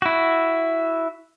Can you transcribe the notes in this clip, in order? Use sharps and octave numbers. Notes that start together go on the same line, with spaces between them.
E4 F#4